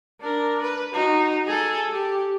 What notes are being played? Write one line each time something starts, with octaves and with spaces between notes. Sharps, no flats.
D4 A#4
B4
D#4 F#4
G#4 A4
G4